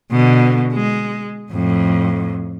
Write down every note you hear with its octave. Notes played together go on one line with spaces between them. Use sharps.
B2 D3
G#3
F2 A2